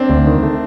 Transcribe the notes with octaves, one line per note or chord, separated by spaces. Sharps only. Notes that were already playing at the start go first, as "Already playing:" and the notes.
Already playing: C4 D4
D2
D#3
A3